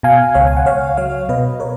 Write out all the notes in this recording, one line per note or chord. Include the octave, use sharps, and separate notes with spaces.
B2 F5 G#5
C#2 C#5 F5
G#5
F#5
C#2 C#5 F5
F#3 C#5 F5
B2 B4 D#5
A#4 C#5